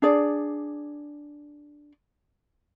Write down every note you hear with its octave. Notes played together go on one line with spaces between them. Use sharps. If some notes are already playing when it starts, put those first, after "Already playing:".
D4 G#4 D5